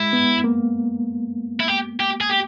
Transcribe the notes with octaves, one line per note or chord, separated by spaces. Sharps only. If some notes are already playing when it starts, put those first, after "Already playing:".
Already playing: G#3 E4
B3
A#3
E4
G4
G4
G#4
G4